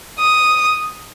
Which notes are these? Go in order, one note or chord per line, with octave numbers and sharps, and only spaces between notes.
D#6